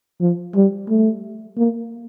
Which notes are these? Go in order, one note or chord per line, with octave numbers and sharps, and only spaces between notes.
F3
G3
A3
A#3